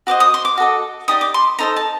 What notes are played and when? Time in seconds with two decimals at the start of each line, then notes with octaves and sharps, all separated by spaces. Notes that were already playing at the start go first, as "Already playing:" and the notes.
0.07 F#4 C5 D#5 D6
0.20 D#6
0.34 C6
0.45 D6
0.58 F#4 A4 D#5
1.08 D#4 G4 D5 D#6
1.21 D6
1.34 C6
1.59 D#4 A4 C5 D#5 A#5
1.76 A5